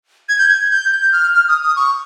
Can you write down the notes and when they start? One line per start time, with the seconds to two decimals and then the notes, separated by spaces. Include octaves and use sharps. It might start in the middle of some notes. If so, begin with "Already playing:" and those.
0.29 G#6
0.39 G6
0.49 G#6
0.71 G6
0.92 G6
1.12 F6
1.34 F6
1.48 D#6
1.63 D#6
1.76 C#6